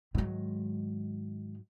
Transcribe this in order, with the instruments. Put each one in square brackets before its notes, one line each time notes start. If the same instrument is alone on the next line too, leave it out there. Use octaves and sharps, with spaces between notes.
[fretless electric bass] G#2 F#3 [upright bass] D#3 G#3